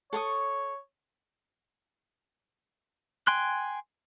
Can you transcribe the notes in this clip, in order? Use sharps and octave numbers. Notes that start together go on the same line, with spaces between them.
A4 C#5 C#6 D#6
G5 G#5 C6 F#6